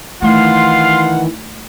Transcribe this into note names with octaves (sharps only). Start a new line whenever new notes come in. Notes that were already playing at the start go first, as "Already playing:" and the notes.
D#3 E3 A3 D#4 F4 F5 F#5 C6